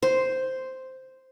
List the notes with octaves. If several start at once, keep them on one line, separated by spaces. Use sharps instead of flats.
C5